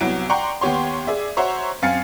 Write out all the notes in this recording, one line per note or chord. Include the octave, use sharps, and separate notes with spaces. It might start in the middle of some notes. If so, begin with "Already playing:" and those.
C2 F#3 B3 E4 D7
D5 F#5 G5 A#5 C6 C#6
D#2 B3 G4 C#5 C6
G#4 D5 E5
F#4 C5 C#5 E5 A#5
F#2 C4 F5 G#5 A6 C#7